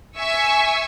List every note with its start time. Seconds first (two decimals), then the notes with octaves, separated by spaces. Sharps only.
0.17 E5 G#5 C#6 E6